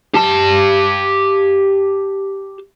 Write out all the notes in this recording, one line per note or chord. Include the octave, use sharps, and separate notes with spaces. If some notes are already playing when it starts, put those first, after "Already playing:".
G4 A5